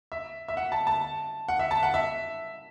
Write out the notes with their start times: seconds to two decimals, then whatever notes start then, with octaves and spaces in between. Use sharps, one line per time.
0.12 E5
0.48 E5
0.57 F#5
0.72 A5
0.87 A5
1.48 F#5
1.59 E5
1.71 A5
1.83 F#5
1.94 E5